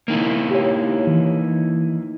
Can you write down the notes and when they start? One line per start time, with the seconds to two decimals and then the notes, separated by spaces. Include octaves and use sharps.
0.08 A#3 D#4 E4
0.51 G4 C#5
1.07 E3